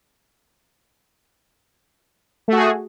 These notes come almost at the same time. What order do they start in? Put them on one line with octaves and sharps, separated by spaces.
A3 F#4 G#4